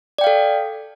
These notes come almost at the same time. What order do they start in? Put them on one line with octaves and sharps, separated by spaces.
D5 G5 F5 A4